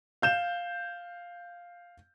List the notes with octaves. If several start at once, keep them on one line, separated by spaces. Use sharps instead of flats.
F5 G6 E7